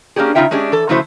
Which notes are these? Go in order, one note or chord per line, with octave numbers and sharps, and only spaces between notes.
A#3 C#4 D4 G4 G#4
C#3 G3 D#4 F4 E5 G5
G#3 C#4 D4 G4 G#4
E3 A4
C#3 F3 A3 E4 F#4 C5